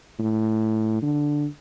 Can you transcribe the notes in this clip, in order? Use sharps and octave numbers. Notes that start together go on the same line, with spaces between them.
A2
D3